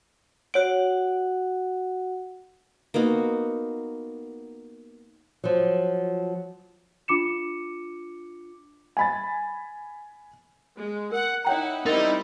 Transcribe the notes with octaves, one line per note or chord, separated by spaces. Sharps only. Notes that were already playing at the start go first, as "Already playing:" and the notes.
F#4 C#5 F#5 D7
A#3 B3 D#4 F#4
F3 F#3
D4 F4 D6 C#7 E7
G#5 B5 A6
G#3
A#4 F#5
D#4 E4 C#5 F#5 G5 A#5
G3 C4 D#4 E4 A#4 D#5 C6